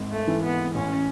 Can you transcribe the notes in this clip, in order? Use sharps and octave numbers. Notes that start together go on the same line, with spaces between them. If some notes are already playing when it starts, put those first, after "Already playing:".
Already playing: G#1 G#3
A3
E3
B3
A1 C#4